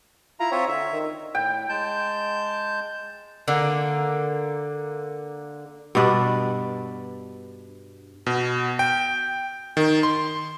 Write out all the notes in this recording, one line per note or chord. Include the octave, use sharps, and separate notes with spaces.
E4 F4 A#5
C4 F4 C#5 E5
D3 E5
D#3
A2 G5
G#3 A5 G6
D3 A#3
G2 B2 D4 B4
B2
G5
D#3
C6